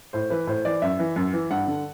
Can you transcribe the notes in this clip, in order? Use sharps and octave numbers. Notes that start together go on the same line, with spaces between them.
A2 C5
E3 B4
A2 C5
E3 D5
F#2 E5
E3
F#2
E3
G2 F#5
D3